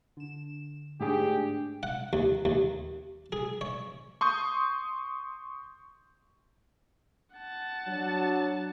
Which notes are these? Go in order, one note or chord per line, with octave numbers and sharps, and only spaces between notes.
D3 E7
G#2 A3 D4 G4 G#4
F#5
D#2
D#2
G#4
C#5
C6 C#6 D#6 G6
F#5 A5
F#3 D4